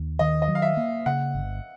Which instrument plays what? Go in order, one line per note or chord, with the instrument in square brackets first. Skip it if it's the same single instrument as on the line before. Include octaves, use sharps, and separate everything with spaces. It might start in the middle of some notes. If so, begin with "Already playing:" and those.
Already playing: [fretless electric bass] D#2
[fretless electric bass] D#3 [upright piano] D#5
[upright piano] D#5
[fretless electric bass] F#3
[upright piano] F5
E5
[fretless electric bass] A#3
[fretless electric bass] C#3 [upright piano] F#5
[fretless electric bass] G1